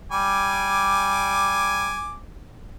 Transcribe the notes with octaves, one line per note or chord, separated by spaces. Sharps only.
G3 G#5 D6